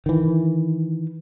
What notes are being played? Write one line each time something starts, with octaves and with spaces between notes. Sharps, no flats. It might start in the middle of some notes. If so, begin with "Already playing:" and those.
D#3 E3